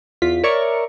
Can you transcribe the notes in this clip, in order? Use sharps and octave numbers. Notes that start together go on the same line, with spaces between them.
E2 F4 B6
A#4 C#5 D5 E5 C#6